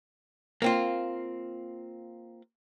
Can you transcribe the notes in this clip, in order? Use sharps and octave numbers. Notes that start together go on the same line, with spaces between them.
A#3 C4 F4